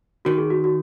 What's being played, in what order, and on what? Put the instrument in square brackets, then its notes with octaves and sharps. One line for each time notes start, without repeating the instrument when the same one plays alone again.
[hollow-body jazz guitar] D#3 [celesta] F#4
[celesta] G#4
F#4
F#4